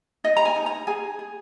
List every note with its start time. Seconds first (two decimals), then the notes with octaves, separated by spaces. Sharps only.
0.24 D#4 D#5
0.37 A#5
0.45 G#5
0.56 D#4
0.66 A#5
0.87 G#4 G#5
1.19 G#4